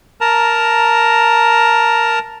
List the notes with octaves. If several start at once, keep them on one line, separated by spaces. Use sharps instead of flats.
A#4 A5 A#5